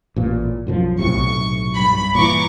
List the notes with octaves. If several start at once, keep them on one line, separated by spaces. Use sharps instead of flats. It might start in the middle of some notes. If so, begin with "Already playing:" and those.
A1 A#2
B1 F#2 F3
B1 A2 C3 C#6
G2 B5
A#2 E3 A#5 C#6 D6